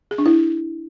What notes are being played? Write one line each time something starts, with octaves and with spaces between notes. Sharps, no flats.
G#4
D4
E4